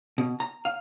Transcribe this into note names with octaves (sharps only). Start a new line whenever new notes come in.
B2
A#5
F5